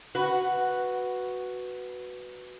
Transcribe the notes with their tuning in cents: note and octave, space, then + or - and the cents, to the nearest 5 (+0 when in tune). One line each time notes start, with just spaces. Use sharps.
F#4 +0 B4 +0